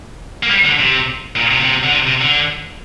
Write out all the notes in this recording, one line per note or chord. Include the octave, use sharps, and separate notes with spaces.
A#3
G3
D3
C3
A#2
C3
A#2
C3
D3
C3
C3
D3